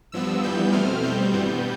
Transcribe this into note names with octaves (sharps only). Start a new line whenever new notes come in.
G2 F3 B3 E6
F2 E3 G3 B3 G6
B2 A3 C4 F6
B2 G3 C4 G6
G2 E3 G3 B3